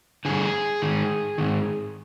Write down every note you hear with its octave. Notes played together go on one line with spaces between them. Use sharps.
G2 D3 G#4
G#2 D#3
G#2 D#3